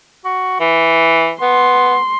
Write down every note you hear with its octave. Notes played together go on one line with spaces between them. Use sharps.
F#4
E3
B3 C6